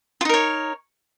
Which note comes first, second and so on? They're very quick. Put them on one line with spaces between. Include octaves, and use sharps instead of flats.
F4 D#4 A#4 C#5